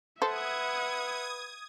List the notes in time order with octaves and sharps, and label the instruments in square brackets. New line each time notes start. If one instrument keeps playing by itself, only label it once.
[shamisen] A4 C5 [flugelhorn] B4 [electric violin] E5 F#5 [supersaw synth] D#6 G#6